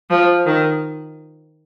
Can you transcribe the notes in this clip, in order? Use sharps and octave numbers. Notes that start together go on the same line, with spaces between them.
F3
D#3